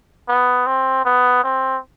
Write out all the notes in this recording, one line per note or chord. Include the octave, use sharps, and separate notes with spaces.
B3
C4
B3
C4